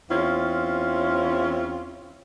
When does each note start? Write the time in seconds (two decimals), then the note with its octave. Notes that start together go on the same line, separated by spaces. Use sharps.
0.10 E2 C4 C#4 E4 F4